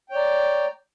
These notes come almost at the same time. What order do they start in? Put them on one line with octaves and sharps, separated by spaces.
G5 C#5 D5 A#5